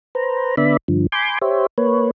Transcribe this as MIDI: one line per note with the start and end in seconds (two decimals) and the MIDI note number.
0.15 0.56 71
0.15 0.56 72
0.15 0.56 82
0.57 0.77 50
0.57 0.77 59
0.57 0.77 74
0.57 0.77 76
0.57 0.77 83
0.88 1.07 43
0.88 1.07 50
0.88 1.07 53
1.12 1.38 80
1.12 1.38 83
1.12 1.38 84
1.12 1.38 86
1.12 1.38 91
1.41 1.66 67
1.41 1.66 72
1.41 1.66 73
1.41 1.66 76
1.78 2.11 58
1.78 2.11 71
1.78 2.11 73